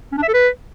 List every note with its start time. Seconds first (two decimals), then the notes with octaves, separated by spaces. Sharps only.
0.12 C#4
0.17 D4
0.23 E5
0.28 A4
0.33 B4